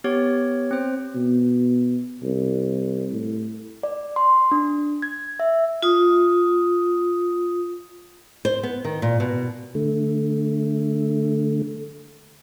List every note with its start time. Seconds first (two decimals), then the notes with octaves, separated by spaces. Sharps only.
0.04 B3 G4 C#5
0.71 C4 C5
1.15 B2
2.23 C2
3.12 A2
3.83 D5
4.16 C6
4.52 D4
5.02 G#6
5.40 E5
5.82 F4 D#6
8.45 C5
8.63 B3
8.85 D#3
9.02 A#2
9.20 B2
9.75 D3 A3